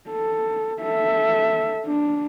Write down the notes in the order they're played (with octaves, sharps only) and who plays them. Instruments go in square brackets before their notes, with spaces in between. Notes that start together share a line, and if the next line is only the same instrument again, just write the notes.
[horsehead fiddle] A4
A4 E5
D4